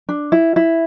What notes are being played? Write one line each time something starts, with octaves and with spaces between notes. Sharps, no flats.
D4
E4
E4